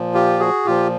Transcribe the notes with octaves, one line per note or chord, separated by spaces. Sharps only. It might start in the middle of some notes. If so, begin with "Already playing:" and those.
Already playing: A#2 F3
F4 G4
F#4 G#4
A#2 F3 F4 G4